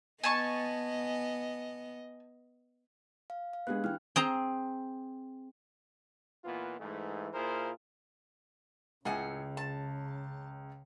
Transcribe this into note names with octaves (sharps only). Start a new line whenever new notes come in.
B3 D#5 G#5 A5 C#6
F5
F5
G#3 B3 D4 G4 F#6
E3 G5 F6
C4 G#4 A#5
A#2 E3 B3 F4
G#2 E3 A3
A#2 E4 F4 G#4 A#4 C5
C#2 A2 C#3 F#5 G#5
A5